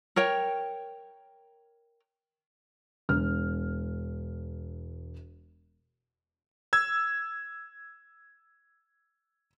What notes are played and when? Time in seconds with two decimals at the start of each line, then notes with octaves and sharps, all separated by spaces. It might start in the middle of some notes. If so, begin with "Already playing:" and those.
0.16 A#4 C#5 G5
3.09 E1 F6
6.73 E6 G#6